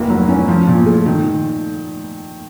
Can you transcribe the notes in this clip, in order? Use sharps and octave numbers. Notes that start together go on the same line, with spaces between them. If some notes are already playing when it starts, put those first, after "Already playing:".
Already playing: F1 A#3
F#3
C#4
F3
A#2
A3
D#3